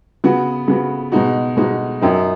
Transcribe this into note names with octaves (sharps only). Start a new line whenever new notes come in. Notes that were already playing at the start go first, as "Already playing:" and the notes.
C#3 B3 F#4
C#3 B3 F#4
B2 G#3 D#4 F#4
B2 G#3 D#4 F#4
F#2 F#3 D#4